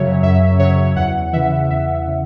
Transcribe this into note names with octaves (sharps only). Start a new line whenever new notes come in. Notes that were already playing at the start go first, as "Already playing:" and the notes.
Already playing: F#2 C#3 F#3 C#5 E5
F#2 E5
C#3 F#3 C#5
E2 F#5
C#3 E3 E5
E2 E5
E5
C#3